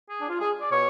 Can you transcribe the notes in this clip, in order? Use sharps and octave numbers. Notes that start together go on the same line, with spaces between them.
G#4
D4
F4
G#4
D5
B2 C#5